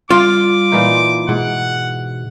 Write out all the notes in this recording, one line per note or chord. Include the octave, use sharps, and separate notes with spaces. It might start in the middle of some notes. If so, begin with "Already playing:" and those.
G3 F4 D6
A#2 E3 D#4
G#2 B2 F#5